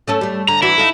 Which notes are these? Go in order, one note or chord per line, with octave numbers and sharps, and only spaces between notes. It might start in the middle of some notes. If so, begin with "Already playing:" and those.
A3 C#4 A4
G3 A3
D3 A#5
E3 D4 E4 F#4
D#4 F4 A4